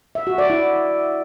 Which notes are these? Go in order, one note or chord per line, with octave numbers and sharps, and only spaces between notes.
E5
F#4
D5
E4